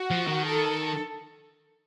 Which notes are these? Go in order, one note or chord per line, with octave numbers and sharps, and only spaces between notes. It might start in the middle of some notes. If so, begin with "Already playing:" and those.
Already playing: F#4
F3
D#3
A4